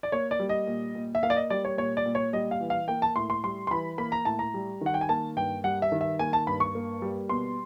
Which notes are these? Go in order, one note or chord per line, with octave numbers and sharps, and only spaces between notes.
D5
A#3 C#5
D5
G3
D#5
A#2
A#2
E5
A#3 F5
D5
D#5
G3 D5
C#5
A#2 C#5
D5
A#2
C#5
G3 D#5
F5
E3
F5
A#3 G5
A5
A2 C6
C6
G3 C6
C6
E3 B5
A#3 B5
A#5
A2 A5
A#5
G3
D#3 F#5
G5
G#5
A#3 A5
G2 G5
G3 F#5
E5
D#3
E5
A#3 G#5
A5
G2 B5
C#6
A#3
G3
B2 C6